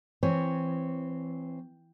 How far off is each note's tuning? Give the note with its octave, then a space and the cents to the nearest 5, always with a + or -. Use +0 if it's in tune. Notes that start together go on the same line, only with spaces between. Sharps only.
E3 +20 C4 +0 C#5 +0